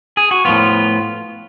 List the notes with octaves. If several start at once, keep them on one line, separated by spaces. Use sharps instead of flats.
G#4
F#4
A2 F3 B3 F4